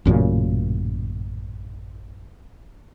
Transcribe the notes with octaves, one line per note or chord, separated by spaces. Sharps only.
A1 F#2 A#2 C#3